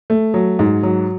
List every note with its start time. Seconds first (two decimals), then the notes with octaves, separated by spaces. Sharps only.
0.10 A3
0.34 F#3
0.59 G#2
0.83 F#3